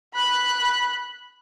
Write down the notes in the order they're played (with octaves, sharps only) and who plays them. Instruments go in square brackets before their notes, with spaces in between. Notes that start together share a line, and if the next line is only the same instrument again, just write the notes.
[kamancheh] B5 F#6